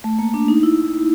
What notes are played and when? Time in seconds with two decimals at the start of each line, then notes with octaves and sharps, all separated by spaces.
0.04 A3
0.19 A#3
0.34 D4
0.48 D#4
0.63 E4